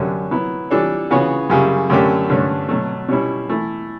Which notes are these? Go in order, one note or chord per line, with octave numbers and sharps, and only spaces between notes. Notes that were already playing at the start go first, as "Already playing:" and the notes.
Already playing: F#2 D3 F#3 C#4 G4
F#3 B3 E4
E3 G3 D4 A4 C#5
C#3 E3 B3 F#4 C#5
F#2 C#3 G3
F#2 D3 A3 C#4 G4
G2 D3 A3 C#4
B2 F#3 A3
B2 G3 C#4 E4
E3 A3 E4